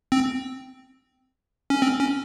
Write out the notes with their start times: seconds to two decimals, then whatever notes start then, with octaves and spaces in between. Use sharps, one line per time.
0.12 C4
1.70 C#4
1.82 C4
2.00 C#4